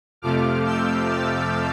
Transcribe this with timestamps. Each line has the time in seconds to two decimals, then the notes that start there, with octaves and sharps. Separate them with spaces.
0.22 F2 C3 F3 A3 D6 F6
0.66 E6 G6
1.09 F6 A6